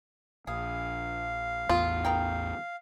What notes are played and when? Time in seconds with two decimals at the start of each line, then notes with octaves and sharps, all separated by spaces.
0.47 A#1 G#4 F5
1.69 A1 E2 B3 F4 G#4
2.05 G#4 A#4 G5